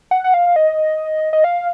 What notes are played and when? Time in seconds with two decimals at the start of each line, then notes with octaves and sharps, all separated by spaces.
0.11 F#5
0.24 F#5
0.34 F5
0.56 D#5
1.33 D#5
1.44 F5